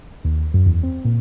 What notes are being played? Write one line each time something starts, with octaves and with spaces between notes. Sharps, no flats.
D#2
F#2
E2
C4
A#2